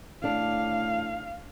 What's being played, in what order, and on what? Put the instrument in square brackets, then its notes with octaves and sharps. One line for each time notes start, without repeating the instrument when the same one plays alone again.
[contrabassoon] A2 [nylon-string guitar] D4 [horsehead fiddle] F5